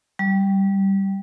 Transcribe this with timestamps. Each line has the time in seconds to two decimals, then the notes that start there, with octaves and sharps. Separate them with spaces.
0.19 G3